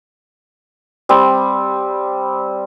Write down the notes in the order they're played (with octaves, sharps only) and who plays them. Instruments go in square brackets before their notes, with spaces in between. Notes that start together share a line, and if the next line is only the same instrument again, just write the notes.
[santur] G3 C4